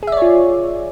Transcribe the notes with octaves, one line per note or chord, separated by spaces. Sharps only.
F4 G#4 C#5 D5 E5